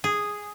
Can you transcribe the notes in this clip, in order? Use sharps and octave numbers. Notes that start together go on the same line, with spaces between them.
G#4